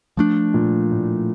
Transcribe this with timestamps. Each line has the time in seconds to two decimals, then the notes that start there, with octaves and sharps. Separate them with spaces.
0.17 F3 A3 D4
0.54 A#2
0.91 A2